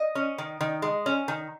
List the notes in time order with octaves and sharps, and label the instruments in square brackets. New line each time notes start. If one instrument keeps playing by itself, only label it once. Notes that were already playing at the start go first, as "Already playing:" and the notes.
Already playing: [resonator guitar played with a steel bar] D#5
C#4
D#3
D#3
G#3
C#4
D#3